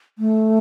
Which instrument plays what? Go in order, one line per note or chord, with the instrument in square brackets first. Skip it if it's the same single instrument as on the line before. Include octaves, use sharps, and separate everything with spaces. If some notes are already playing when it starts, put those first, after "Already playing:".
[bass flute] A3